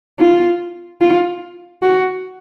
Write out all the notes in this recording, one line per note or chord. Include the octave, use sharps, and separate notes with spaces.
F4
F4
F#4